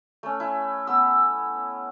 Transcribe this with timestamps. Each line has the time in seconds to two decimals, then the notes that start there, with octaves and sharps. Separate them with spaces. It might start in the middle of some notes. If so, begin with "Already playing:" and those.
0.23 A3 C#4
0.40 E4
0.87 B3 E6